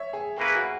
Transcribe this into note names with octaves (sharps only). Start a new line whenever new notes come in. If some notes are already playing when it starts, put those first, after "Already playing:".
Already playing: C#5 E5
G#4
A#3 C#4 E4 G#4 B4
F#4